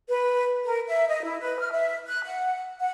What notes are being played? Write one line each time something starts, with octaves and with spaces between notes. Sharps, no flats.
B4
A#4
E5
D#5
E4
B4
F6
E5
F#6
F#5
F#5